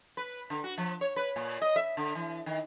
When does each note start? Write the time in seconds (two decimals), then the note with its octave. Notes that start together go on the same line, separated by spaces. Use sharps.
0.17 B4
0.50 D3
0.64 F#4
0.78 F3
1.01 C#5
1.16 B4
1.36 A#2
1.62 D#5
1.76 E5
1.97 D3
2.15 E3
2.46 D#3